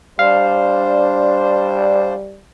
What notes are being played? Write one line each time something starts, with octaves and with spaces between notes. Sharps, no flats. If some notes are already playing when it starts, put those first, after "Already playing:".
G3 D4 C5 F5